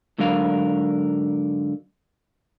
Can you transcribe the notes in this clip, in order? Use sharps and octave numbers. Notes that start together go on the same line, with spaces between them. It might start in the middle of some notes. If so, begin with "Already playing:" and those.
G#2 D3 F#3 A#4 F5